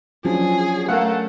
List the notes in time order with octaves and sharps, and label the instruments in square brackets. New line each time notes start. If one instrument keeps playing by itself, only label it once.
[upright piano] F3 [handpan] F#3 C#4 D4 [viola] G#4
[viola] A3 [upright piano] A#4 F5 F#5